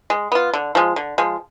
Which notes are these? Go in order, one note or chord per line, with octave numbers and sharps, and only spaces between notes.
G#3
B3 F4
D3
F3 G#3
D3
F3 G#3